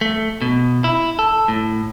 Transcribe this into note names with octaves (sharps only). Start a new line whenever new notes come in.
A3
B2
E4
A4
A2